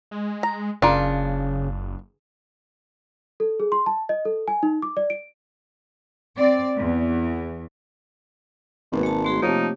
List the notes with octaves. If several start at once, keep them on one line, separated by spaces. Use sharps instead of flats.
G#3
A#5
F#1 C#3 D4 F4 A#4
A4
G#4
C6
A5
D#5
A4
G#5
D#4
D6
D5
D7
C4 D5
E2
G#1 B2 A#3 B3
G#3 A5
A3 F#4 G#4 C6
C3 F3 A3 A#3 D#4 C#5